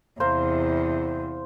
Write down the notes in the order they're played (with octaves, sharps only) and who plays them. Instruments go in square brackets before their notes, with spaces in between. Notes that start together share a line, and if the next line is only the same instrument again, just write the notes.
[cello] E2 C3 [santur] C5 F5 A#5